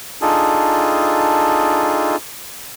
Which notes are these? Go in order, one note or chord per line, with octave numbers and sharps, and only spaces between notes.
D4 D#4 F4 G#4 A4